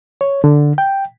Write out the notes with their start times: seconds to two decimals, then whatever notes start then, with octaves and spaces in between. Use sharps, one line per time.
0.21 C#5
0.44 D3
0.78 G5